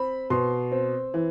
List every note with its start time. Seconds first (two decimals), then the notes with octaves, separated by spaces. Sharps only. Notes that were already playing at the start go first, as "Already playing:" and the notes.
Already playing: C4 B5
0.30 B2 C6
0.72 C4
1.14 E3